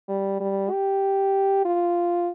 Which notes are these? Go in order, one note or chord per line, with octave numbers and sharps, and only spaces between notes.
G3
G3
G4
F4